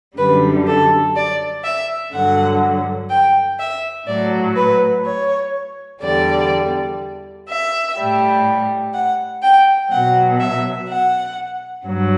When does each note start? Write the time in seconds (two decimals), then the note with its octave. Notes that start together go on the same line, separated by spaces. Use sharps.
0.17 F#2 D3 G3 B4
0.66 A4
1.15 D5
1.63 E5
2.12 G2 D3 F#3 F#5
3.10 G5
3.59 E5
4.06 A2 F#3 D5
4.55 B4
5.04 C#5
6.01 E2 D3 G3 D5
7.48 E5
7.97 A2 G3
8.94 F#5
9.42 G5
9.91 B2 F#3 F#5
10.39 E5
10.88 F#5
11.85 G2 F#3